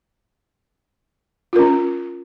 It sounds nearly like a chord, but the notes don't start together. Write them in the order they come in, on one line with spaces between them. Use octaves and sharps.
F4 A#4 C#4